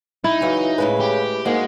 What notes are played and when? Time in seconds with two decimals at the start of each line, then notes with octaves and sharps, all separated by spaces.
0.24 D#4 E4
0.41 C#3 E3 F#3 F5
0.78 A2 C#3 G#3 B4
1.00 G4
1.45 G#2 G#3 A#3 F#4